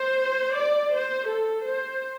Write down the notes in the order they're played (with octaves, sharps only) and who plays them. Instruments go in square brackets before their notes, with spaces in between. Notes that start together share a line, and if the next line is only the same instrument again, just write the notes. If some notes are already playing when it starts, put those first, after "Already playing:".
Already playing: [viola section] C5
D5
C5
A4
C5